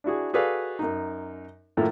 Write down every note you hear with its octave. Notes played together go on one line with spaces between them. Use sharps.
D4 E4 F#4 G#4
F#4 G#4 A4 B4 D5 F5
F#2 D#4
F#2 A2 D#3 F3 A3 A#3